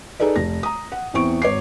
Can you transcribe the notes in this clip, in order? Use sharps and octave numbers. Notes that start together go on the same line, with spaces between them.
D#4 G#4 A4 B4 D5
F1 A#6
A#5 D#6
F#5
E2 E3 C4 C#6 D7
G#1 C#5 D6 C7